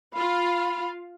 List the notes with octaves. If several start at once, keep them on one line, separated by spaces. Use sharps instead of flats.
F4 F5 B5